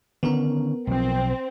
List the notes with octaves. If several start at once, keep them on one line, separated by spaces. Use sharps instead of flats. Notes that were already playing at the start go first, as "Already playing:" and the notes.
D3 D#3 B3 C#4 A#4
B1 F3 C4